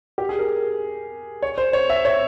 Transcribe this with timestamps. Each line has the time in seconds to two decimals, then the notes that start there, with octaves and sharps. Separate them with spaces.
0.18 G4
0.29 G#4
0.39 A#4
1.42 C#5
1.58 C5
1.73 C#5
1.90 E5
2.05 C#5